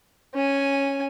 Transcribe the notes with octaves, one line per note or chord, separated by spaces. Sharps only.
C#4 G#5